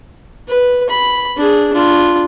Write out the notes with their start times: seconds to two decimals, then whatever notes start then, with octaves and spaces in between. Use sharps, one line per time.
0.48 B4
0.90 B5
1.37 D4 G#4
1.73 D4 F4